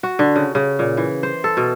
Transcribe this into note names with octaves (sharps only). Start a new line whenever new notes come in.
F#4
D3
C#3
C#3
A#2
E3
C5
A4
B2